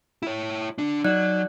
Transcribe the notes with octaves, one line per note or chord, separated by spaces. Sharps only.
E4 C#5
D3 D4
F#3 D#4 D5 F#6